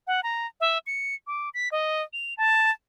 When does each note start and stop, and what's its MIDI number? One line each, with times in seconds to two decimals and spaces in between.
0.07 0.21 78
0.23 0.47 82
0.61 0.78 76
0.87 1.15 97
1.27 1.49 86
1.54 1.69 95
1.72 2.02 75
2.13 2.34 101
2.37 2.70 81